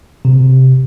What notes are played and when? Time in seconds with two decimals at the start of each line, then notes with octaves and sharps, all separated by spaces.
0.25 C3